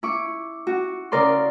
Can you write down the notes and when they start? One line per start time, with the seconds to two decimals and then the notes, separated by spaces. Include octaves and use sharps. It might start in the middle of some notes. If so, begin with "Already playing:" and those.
0.03 E4 C#6 D6
0.67 F#4
1.12 C#3 A#4 D5 C6